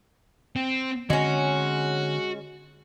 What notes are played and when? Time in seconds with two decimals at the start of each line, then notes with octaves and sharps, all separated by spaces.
0.56 C4
1.10 D3 G#3 C4 C#4 F#4